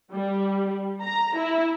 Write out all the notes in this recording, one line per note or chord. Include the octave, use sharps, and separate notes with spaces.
G3
A#5
E4